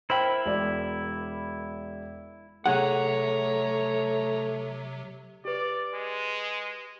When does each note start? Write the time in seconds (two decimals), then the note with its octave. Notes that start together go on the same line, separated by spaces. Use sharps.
0.10 E4 A#4 C5 G5 B5
0.45 E1 D5
2.66 C3 F#3 A3 G#4 C#5 F#5 A#5
5.45 G4 B4 D5
5.94 G#3